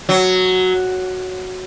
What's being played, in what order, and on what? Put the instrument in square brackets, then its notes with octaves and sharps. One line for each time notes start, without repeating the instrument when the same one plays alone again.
[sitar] F#3